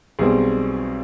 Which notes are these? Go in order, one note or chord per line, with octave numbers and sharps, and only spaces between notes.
B1 B2 G3 C4 G#4